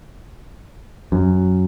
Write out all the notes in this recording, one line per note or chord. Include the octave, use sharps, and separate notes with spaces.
F#2